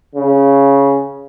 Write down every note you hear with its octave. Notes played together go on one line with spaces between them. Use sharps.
C#3